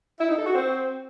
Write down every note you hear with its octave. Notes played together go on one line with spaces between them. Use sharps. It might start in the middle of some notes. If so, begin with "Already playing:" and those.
E4
D#4
A4
F#4
C4